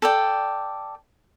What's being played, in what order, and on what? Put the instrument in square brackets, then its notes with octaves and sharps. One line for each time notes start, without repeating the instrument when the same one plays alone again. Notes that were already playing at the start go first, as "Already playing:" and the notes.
[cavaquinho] A4 D5 G5